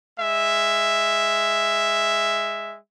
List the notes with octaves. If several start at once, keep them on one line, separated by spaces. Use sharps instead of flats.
G#3 E5